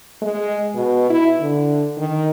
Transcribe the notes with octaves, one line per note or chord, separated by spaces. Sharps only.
G#3
B2
E4
D3
D#3